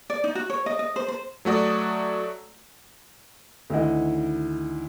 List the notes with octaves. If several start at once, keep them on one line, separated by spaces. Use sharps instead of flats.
D5
D#4
F#4
C#5
D#5
D#5
C5
C5
F#3 A3 F#4 D5 D#6
D2 D#3 E4 D#5 F#5